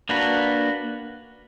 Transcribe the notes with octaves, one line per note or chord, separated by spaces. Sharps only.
A#3 D4 F#4 B4